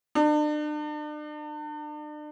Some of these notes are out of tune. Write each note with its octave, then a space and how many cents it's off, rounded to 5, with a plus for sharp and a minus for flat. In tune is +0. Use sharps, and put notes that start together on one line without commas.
D4 +40